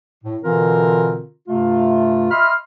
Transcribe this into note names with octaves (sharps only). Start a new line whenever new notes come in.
A2
B2 D3 E3 C4 F4 A#4
G2 C3 A3 F4
D#5 E5 B5 C6 F6